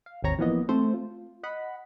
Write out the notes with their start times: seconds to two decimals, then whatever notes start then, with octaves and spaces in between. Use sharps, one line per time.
0.06 F5
0.22 G#1 D#2 C4 C#5 A#5
0.38 E3 F3 A#3 B3 D#5
0.69 A3 C4 A4 C5
0.94 F4
1.43 D#5 F#5 B5